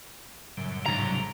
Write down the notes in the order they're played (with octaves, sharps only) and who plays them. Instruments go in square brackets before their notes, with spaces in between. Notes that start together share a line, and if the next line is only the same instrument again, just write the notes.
[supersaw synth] F#2 [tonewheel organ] A2 C#3 G3
[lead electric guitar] C2 A#5 [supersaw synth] G#2 D3 F#3